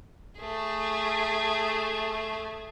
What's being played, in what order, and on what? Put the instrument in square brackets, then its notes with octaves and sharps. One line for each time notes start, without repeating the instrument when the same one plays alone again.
[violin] A3 G#4